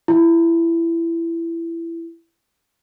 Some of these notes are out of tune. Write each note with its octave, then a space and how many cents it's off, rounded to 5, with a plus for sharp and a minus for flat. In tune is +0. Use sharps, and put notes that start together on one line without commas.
E4 +20